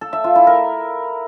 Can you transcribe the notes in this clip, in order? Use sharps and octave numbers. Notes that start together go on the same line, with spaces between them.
A4
E5
F4
E4
A#4